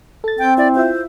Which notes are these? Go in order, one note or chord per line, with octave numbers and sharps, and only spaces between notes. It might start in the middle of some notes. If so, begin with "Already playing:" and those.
A4 A6
C4 G5
E4 D5
E4 F4 C5 E5